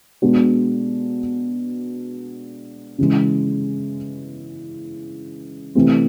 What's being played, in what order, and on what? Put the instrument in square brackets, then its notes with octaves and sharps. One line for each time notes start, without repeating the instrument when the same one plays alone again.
[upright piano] B2 G#3 B3 D4 F#4
C#3 E3 G#3
C3 E3 A3 C4